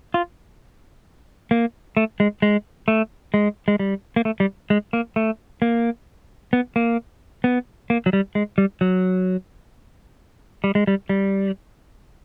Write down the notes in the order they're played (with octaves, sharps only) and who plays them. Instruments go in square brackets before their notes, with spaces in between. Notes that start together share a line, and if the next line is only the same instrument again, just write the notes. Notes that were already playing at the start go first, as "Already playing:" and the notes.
[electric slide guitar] F4
A#3
A3
G#3
G#3
A3
G#3
G#3
G3
A#3
A3
G3
G#3
A#3
A3
A#3
B3
A#3
B3
A#3
F#3
G3
G#3
G3
F#3
G3
G#3
G3
G3